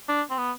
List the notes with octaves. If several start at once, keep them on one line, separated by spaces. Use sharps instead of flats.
D4
C4
B3